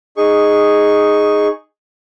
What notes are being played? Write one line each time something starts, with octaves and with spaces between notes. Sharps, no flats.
D#4 G#4 C#6